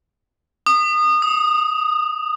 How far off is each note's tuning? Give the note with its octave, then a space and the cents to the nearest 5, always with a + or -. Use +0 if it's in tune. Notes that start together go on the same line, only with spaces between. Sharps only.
D#6 -25
D#6 +15